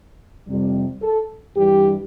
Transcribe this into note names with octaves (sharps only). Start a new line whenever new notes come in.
F2 C3 G3
A4
G2 E3 G3 G4